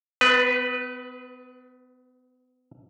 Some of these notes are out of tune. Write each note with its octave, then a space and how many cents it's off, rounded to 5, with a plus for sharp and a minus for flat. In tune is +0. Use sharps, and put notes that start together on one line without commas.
B3 +40 B4 +0